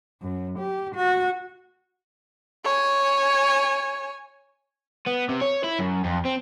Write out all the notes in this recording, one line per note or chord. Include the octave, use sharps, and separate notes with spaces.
F#2
G4
F#4
C#5 G#5
B3
C3
C#5
E4
F#2
F2
C4